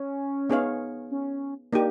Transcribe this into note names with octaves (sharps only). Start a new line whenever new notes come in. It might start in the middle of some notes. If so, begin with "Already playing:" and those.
Already playing: C#4
B3 D#4 G#4 C#5 F5
C#4
A#3 D4 D#4 G4